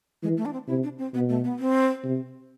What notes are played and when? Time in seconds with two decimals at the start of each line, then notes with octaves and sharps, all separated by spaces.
0.23 E3 G#3
0.37 A3
0.45 D4
0.53 C4
0.68 C3 E4
0.83 D4
0.98 C4
1.14 B2 B3
1.29 A3
1.44 B3
1.59 C4
2.04 C3